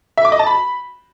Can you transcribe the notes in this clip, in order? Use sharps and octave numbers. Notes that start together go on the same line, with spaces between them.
E5
D6
D#5
A5
B5